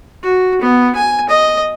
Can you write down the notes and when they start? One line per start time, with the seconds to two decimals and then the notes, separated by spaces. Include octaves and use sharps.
0.23 F#4
0.61 B3
0.96 G#5
1.29 D#5